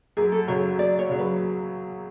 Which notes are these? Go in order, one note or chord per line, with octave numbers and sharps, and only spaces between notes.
F#2 G#4
A4
C#3 F#3 C#5
F#2 D5
C#5
C#3 F#3
B4